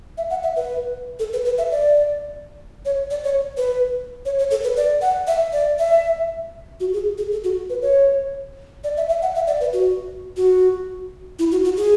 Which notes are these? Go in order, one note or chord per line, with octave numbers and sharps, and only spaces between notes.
E5
F#5
E5
B4
A4
B4
B4
E5
D5
C#5
D5
C#5
B4
C#5
C#5
A4
B4
D5
F#5
E5
D5
E5
F#4
G#4
G#4
A4
F#4
B4
C#5
D5
E5
E5
F#5
E5
D5
B4
F#4
F#4
E4
F#4
F#4
G#4